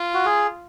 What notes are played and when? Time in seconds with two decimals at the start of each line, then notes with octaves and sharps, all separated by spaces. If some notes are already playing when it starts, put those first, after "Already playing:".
Already playing: F4
0.14 F#4
0.26 G#4